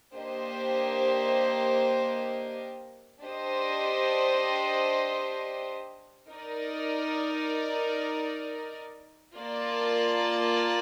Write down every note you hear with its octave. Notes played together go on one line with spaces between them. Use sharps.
A#3 D4 G4 C5 D#5
D4 G4 C5 D#5
D#4 A#4 D5
A#3 F4 A#4 D5 A5